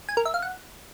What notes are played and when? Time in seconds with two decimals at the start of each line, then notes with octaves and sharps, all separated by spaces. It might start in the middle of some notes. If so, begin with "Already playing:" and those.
0.09 G#5
0.17 A#4
0.25 E5
0.34 F5
0.42 F#5